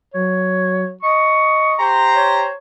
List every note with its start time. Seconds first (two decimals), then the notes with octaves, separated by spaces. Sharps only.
0.14 F#3 C#5
1.03 D#5 C#6
1.79 G4 C5 A#5 C6
2.15 C#5